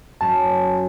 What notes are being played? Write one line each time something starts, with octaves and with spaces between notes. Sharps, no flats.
F#2 A5